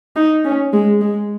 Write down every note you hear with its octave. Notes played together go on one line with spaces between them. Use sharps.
D#4
C#4
G#3
G#3